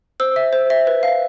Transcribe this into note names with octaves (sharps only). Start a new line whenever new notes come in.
C5 E6
E5
C5
E5
B4
F5